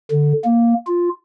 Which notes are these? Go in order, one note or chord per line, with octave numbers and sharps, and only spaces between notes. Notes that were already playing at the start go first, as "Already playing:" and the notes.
D3
A#3
F4